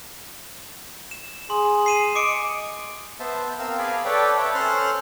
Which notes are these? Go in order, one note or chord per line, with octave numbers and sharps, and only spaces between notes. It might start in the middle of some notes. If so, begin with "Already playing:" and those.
E7
G#4 C6
C7 D#7 E7
D#5 D6 C#7 D7
B3 C5 E5 A5
C4 A#4 F5 E6
G#4 F5 G#5 A5 B5 D6
A4 B4 C#5 D5 G5 A5
B4 C#5 E5 A5
C#4 A4 C5 C6 F6 F#6